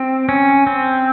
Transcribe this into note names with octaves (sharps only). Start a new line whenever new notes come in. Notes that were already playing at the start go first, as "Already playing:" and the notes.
Already playing: C4
C#4
C4